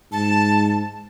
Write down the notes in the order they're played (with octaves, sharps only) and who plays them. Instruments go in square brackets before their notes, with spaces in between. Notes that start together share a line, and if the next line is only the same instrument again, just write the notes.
[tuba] G#2 [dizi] A5